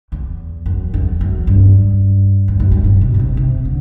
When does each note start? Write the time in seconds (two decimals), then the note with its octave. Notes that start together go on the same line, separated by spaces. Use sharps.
0.12 E2
0.66 F#2
0.94 E2
1.21 F#2
1.47 G2
2.48 E2
2.60 F#2
2.72 G2
2.84 A2
3.01 B2
3.14 B2
3.19 C3
3.37 C3
3.65 D3